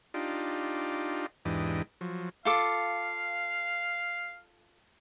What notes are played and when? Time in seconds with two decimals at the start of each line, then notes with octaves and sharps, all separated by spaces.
0.14 D4 D#4 F4 G4
1.45 E2 G#2 E3 D4 G4 D#5
2.01 F3 F#3
2.45 F4 A4 F5 D6